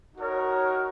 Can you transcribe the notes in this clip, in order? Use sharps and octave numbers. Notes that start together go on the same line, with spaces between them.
D#4 F#4 A#4 C#5